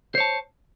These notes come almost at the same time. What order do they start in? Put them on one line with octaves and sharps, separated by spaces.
C5 C#5 A5